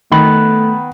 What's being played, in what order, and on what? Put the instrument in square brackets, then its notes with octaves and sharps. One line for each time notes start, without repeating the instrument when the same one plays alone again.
[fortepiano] D#3 [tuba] A3 [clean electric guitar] B3 B5